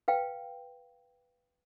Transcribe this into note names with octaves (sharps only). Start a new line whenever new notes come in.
B4 F5 G5